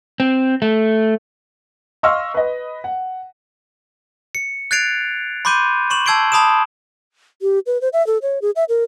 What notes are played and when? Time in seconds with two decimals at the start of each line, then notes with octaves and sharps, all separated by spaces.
0.20 C4
0.62 A3
2.03 D#5 F5 C6 C#6 E6 F6
2.34 B4 D#5
2.84 F#5
4.35 C#7
4.71 F#6 G#6 A6 C7 D7 F7
5.45 B5 C6 D6 G6 D#7
5.90 C6 C#6 E7 F#7
6.06 A5 E6 G#6 C7 D7 G7
6.32 A5 B5 D#6 D7 E7
7.42 G4
7.66 B4
7.81 C5
7.93 E5
8.07 A4
8.22 C#5
8.42 G#4
8.56 E5
8.69 A#4